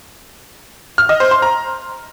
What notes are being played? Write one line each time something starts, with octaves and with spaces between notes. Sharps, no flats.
F6
D#5
C5
C6
A#5